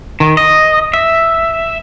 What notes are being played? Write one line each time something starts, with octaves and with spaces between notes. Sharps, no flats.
D#3
D#5
E5